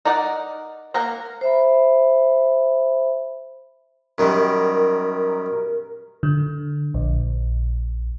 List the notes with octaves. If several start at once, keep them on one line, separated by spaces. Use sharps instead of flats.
D#4 A#4 D5 F#5
A#3 A#4 F#5 A#5
C5 E5 B5
F#2 D#3 G3 A#4
D3
A#1